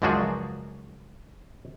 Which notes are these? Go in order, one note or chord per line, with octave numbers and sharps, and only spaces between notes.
C#2 F#2 F3 D4 F#4 G#4